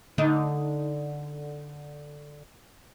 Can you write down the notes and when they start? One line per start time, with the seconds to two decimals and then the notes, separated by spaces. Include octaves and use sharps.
0.18 D3 D#4